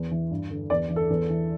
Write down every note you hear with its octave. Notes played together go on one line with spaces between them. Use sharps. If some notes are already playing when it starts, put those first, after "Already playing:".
Already playing: E2
E3
G2
D3
E2 D5
E3
A4
E2
E3